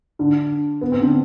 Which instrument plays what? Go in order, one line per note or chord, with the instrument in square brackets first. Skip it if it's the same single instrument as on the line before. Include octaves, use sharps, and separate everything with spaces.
[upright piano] D3 D4
B3
C4
D3 D4